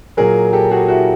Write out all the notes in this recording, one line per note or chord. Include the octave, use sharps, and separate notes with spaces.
A#2 F#3 G#4 A#4
G4 A4
F#4 G#4
E4 F#4